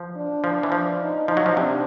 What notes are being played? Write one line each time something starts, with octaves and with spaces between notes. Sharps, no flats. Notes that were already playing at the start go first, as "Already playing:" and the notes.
Already playing: F3
D4
F3
E3
F3
D#4
F3 D#4
F#3
F3
C3 D4